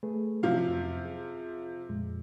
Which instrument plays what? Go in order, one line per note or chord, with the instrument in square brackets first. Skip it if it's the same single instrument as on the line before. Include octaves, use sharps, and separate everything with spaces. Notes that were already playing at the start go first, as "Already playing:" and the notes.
[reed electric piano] A3 G#4 B4
[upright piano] C3 F3 F5 [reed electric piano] F#3 C#4 F#4
[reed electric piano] F2
G#4
F2 A#2 G#3